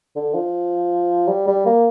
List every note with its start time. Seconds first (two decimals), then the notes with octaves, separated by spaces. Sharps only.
0.16 D3
0.35 F3
1.28 G3
1.47 G3
1.66 A#3